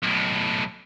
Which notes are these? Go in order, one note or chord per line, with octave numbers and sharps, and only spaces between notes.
B1 A2